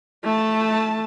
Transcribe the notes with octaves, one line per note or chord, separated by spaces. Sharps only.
A3 A5